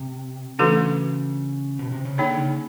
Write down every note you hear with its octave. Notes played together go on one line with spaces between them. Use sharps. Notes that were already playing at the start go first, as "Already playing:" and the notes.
Already playing: C3
C#3 E3 A3 D4 F#4 A4
B2
C3
C#3
D3 A#3 D#4 G#4 C#5
C#3